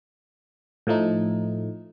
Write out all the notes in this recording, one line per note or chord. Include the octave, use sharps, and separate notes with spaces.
A2 F3 A3 D#4